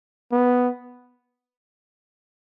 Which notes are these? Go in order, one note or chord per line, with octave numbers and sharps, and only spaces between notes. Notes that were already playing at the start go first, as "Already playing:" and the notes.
B3